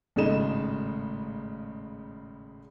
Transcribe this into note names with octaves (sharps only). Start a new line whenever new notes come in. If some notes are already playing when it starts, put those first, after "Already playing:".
G#1 A2 C#3 A3 D#4 E7